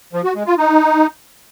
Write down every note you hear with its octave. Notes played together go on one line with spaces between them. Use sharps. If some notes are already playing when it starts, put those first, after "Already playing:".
F3
F#4
G#3
F4
D#4